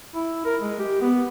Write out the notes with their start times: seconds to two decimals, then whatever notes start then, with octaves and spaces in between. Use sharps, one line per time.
0.15 E4
0.45 A#4
0.61 G#3
0.80 G4
1.01 B3